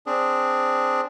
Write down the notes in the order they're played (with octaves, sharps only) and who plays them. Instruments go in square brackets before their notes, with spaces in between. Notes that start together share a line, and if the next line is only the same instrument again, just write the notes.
[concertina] C4 D4 G#4